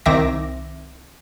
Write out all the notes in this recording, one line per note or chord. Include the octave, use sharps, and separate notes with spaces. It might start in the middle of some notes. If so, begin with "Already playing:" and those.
C2 D#3 C4 E5 D6 A#6